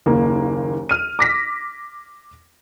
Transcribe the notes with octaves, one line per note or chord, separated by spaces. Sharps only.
F#1 D#2 A#3
F6 D#7
D6 A#6 B6